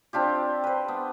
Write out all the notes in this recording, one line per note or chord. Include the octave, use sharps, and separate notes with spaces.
C4 D4 F4 G4
B4 C5
B3